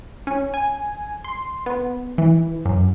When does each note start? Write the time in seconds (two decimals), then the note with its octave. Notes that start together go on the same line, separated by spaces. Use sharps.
0.27 C#4
0.54 G#5
1.24 C6
1.66 B3
2.18 E3
2.66 F#2